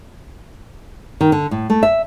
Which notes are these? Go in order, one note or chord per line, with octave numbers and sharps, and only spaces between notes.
D#3
D3
A2
A3
E5